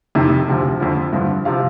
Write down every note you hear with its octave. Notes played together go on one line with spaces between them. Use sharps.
F2 C3 D#3
D2 C3 F3
F2 D3 F3
G2 D3 F3
C3 F3 F5